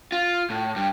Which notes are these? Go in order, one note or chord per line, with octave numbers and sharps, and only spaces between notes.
F4
A2
G2